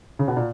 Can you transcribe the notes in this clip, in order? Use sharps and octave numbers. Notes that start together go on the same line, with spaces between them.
C#3
B2
A#2